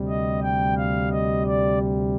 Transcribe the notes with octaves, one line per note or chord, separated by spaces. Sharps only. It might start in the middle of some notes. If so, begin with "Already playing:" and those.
Already playing: D2 C3 G3
D#5
G5
F5
D#5
D5